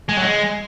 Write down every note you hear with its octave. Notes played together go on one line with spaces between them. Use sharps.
G#3
F#3
G#3